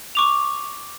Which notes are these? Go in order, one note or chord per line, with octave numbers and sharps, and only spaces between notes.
C#6 D6 F7